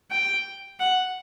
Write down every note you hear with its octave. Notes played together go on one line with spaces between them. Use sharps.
G5
F#5